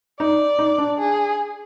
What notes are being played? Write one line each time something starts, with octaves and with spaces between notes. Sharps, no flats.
D#4 D5
D#4
D4
G#4